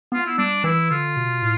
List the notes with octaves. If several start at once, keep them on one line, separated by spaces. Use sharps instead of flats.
B3 F4
E4
G3 D4
E3 E4
D3 F4
B2
A2